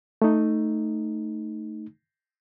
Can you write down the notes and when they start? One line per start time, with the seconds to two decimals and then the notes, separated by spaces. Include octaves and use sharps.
0.22 A3 D#4